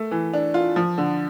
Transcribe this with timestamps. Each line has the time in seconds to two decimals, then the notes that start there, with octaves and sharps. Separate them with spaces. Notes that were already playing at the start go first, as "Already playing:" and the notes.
Already playing: A3
0.11 E3
0.33 D4
0.54 F4
0.76 F3
0.98 D3